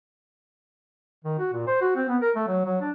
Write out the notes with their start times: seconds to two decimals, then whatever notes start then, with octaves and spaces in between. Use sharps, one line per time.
1.24 D#3
1.39 F#4
1.52 A#2
1.67 C5
1.81 F#4
1.96 C4
2.09 B3
2.22 A#4
2.35 A3
2.47 F#3
2.65 F#3
2.81 D4